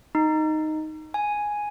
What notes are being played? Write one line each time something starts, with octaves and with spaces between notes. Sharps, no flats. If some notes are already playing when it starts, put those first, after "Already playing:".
D#4
G#5